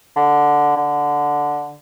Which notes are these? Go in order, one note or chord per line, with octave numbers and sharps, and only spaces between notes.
D3
D3